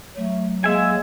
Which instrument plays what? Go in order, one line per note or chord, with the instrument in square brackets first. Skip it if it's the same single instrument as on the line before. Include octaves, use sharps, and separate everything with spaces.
[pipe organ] F#3 [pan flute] A3
[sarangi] G#3 [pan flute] A#3 [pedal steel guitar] E5 G#5